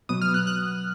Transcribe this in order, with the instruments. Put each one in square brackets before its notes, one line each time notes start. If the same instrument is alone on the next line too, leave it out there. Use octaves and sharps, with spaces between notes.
[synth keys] B2 F#3 B3 D#6
F6
F#6
F#6